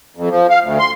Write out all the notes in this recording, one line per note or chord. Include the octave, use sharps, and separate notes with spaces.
F2
F3
F5
D2
C6